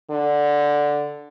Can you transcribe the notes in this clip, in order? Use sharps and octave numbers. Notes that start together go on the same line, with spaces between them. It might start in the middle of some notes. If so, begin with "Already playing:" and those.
D3